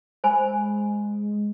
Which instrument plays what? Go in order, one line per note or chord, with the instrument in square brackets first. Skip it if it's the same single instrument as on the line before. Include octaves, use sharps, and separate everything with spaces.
[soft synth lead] G#3 [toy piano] C5 G#5 B5